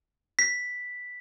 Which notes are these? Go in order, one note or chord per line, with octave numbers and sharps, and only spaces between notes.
B6